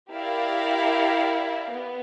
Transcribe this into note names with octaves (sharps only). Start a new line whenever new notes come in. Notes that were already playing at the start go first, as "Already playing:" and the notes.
E4 G4 A#4 D5 F5
B3